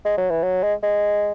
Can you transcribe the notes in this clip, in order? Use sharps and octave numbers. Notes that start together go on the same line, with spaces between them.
G#3
F#3
E3
F#3
G#3
G#3